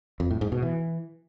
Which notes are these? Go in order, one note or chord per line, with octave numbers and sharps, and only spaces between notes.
F2
A2
G#2
B2
E3